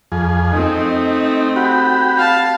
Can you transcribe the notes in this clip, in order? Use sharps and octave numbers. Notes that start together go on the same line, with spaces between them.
F2 G#4
A3 C4 D#4
F#4 G4 B5
F5 A5